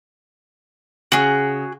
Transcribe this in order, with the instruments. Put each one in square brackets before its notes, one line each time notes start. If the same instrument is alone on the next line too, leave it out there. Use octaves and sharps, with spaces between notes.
[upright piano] C#3 [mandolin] F#4 G#4